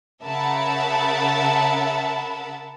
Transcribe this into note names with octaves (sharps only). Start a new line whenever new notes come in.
C#3 A#4 E5 F#5 A5 B5